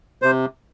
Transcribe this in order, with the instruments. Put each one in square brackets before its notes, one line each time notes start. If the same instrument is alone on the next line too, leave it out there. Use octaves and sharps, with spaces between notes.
[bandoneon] C3 C5